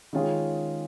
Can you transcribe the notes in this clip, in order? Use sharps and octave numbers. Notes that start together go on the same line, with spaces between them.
D#3 G#3 C#4 F4 G#4